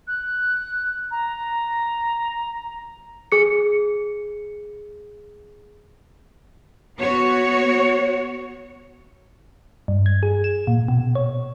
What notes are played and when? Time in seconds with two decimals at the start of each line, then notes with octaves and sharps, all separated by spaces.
0.07 F#6
1.11 A#5
3.32 G#4 C#7
7.00 B3 F#4 C#5
9.88 G2
10.06 G#6
10.23 G#4
10.44 E7
10.67 A#2
10.88 B2
11.15 C#5